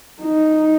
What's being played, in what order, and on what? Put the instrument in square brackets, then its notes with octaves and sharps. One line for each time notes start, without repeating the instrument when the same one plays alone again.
[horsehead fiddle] D#4